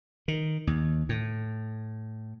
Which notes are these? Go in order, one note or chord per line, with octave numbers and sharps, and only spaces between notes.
D#3
D#2
A2